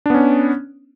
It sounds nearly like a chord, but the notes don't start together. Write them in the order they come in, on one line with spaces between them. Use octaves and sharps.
D4 B3 C#4